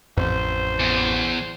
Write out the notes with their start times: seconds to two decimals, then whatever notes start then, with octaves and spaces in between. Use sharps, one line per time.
0.17 A1 F2 C5
0.80 E2